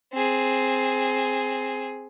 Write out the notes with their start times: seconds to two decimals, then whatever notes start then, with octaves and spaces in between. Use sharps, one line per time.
0.13 C4 G#4